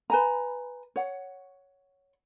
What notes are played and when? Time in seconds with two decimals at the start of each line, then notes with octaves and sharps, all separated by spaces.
0.10 B4 G#5 A#5
0.96 C#5 F#5